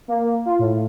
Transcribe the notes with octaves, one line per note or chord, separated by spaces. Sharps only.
A#3
F4
A2